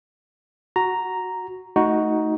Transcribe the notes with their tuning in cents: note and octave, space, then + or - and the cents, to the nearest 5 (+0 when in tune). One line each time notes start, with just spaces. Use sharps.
F#4 +0 A#5 +0
A3 +0 D#4 +10 F#4 +0